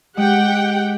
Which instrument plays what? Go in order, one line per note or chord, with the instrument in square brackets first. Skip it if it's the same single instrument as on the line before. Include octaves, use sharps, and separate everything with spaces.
[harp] G#3 [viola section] G4 F#5 G5